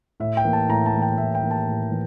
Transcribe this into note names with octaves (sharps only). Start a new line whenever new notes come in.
A2 E5
G5
E3 A#3
A5
A2 A#5
A5
E3 A#3
G5
A2 E5
G5
E3 A#3
A5
A2
E3